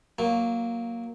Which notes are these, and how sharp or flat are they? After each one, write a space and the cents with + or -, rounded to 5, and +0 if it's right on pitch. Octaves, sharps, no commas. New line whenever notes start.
F#3 +0 A#3 +0